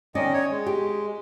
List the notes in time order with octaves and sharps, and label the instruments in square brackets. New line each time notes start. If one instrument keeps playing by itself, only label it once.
[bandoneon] D#3 D#5 [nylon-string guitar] C#4 D5
[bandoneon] C#5
G#3
[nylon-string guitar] G4